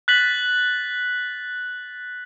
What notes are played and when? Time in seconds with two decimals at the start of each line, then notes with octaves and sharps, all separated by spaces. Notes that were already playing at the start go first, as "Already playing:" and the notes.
0.08 F#6 A6 B6 F#7